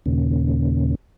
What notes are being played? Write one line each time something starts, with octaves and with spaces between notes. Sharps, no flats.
D#2 A#2 C#3